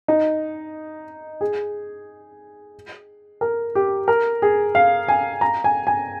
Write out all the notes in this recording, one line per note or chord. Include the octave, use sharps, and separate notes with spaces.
D#4
G#4
A#4
G4
A#4
G#4
F5
G#5
A#5
G#5
G#5